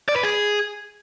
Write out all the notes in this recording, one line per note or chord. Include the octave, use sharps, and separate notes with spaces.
D5
B4
G#4